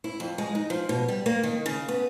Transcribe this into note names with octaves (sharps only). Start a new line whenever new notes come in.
E4
F2
G#3
D#4
F3
B2
G3
A#3
D#3
C#3
B3